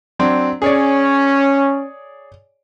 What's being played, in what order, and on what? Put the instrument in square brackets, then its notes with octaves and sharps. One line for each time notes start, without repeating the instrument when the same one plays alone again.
[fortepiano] F#3 C4 D4
[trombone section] C#4 [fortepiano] G#4 C#5 D5